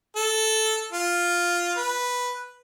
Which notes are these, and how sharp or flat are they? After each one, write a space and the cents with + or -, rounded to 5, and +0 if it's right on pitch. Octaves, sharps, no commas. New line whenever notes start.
A4 -5
F4 +0
B4 -5